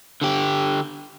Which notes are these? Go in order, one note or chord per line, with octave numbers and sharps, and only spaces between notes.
D3 G4